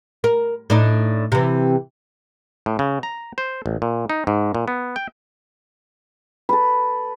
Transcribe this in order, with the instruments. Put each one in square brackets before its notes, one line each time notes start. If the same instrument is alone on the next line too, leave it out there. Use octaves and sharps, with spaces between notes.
[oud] A#4
A2 D4 D#4
C3 E3
[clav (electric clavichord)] A2
C#3
A#5
C5
A1
A#2
D#4
G#2
A#2
B3
G5
[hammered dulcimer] A4 B4